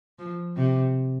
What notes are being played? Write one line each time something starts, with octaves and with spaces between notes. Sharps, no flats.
F3
C3